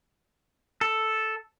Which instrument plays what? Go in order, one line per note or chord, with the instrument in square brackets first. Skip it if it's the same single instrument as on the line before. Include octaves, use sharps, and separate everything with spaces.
[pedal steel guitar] A4